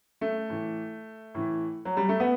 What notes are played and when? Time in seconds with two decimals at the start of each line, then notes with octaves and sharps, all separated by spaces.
0.21 A3
0.50 A2 E3
1.35 A2 E3
1.85 F#3
1.97 G3
2.09 A3
2.20 B3